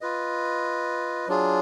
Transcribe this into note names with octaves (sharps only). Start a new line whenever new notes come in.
F4 B4 D#5
F#3 D4 F4 G#4